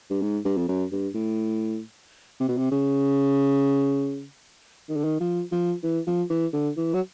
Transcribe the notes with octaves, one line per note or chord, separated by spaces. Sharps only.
G2
G#2
G2
F2
F#2
G2
A2
C3
B2
C3
C#3
D#3
D3
D#3
F3
F3
E3
F3
E3
D3
E3
F#3